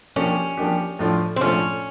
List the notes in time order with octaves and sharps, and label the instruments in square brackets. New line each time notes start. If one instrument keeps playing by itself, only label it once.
[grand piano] F3 A#3 D4 G4 [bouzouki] C#4
[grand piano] F3 A#3 D4 G4
A2 F3 A3 D4 F4
[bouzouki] C4
[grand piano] A2 F3 A3 D4 F4 [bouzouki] C#4